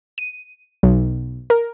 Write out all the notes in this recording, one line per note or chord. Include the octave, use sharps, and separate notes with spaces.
D#7
B1
A#4